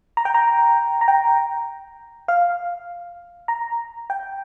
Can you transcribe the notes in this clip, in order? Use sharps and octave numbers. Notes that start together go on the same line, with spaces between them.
A#5
G5
A#5
A#5
G5
F5
A#5
G5